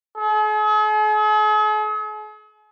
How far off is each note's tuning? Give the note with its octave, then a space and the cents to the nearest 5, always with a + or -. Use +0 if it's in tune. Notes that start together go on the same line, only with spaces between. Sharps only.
G#4 +45